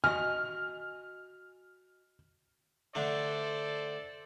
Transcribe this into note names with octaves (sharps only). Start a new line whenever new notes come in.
F#4 D#5 G#5 F6
D3 A3 D4 A4 C5 D5